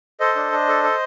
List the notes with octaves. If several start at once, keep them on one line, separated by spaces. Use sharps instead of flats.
A4 C5 D#5
D4
D4
A4
A4